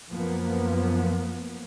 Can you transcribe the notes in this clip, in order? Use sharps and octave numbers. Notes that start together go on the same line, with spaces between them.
F#2 F3 A#3 B3